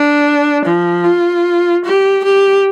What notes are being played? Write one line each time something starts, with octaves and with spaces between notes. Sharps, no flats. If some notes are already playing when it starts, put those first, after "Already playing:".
Already playing: D4
F3
F4
G4
G4